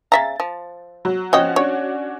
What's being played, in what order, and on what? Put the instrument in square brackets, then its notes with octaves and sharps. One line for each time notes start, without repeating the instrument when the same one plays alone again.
[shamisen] C#3 E5 A#5 [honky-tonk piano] A6
[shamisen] F3
[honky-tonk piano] F#3
[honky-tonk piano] F3 C#4 F#4 [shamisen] C#5 D#5 G5
[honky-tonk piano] C#4 D4 F#4 [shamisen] C#5